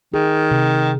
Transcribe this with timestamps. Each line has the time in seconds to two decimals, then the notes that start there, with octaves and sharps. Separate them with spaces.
0.14 D#3 G#4
0.51 C3